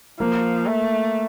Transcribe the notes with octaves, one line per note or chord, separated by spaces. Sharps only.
F3 A#3
A3